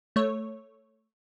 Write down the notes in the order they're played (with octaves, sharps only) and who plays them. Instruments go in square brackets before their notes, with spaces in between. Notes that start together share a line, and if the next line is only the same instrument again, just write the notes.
[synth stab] A3 C#5